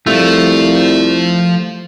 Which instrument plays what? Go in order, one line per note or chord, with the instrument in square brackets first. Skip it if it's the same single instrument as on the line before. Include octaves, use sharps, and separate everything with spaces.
[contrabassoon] C2 [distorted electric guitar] F3 F4 [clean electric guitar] A3